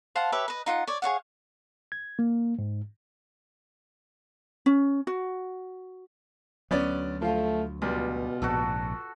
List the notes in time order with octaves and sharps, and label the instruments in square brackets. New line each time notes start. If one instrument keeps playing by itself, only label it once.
[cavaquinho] C5 F5 F#5 A5
G4 B4 C#5 E5
B4 D#5
D#4 F4 F#5
C#5 D5
G#4 C#5 F5 F#5
[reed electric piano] G#6
A#3
G#2
[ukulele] C#4
F#4
[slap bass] D2 F#3 [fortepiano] B3 C#4 D5
[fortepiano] F3 F4 [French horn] A3
[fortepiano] C#2 G3 [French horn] B2 [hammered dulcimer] F4
[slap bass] A#1 G#2 C3 [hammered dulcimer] F#4 A4